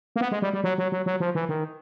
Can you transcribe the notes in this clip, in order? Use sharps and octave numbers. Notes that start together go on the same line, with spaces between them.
A#3
B3
G#3
G3
G3
F#3
F#3
F#3
F#3
F3
E3
D#3